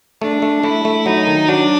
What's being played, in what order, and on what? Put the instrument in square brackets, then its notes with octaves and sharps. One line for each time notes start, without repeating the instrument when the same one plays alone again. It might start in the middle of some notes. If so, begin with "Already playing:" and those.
[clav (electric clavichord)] A3 [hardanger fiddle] D4
[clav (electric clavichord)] A3
[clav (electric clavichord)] A3 [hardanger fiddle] E4
[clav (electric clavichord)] A3
[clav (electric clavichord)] F#3 [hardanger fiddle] D#4
[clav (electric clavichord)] D#3
[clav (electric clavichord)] F#3 [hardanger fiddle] D4